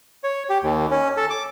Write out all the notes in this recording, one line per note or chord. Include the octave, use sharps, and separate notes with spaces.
C#5
G4
D#2
C#4
A4
D6